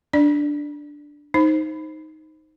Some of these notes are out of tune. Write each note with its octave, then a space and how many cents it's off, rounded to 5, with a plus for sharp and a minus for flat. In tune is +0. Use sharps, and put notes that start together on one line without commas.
D4 +0 D5 +20
D#4 +5 C5 +10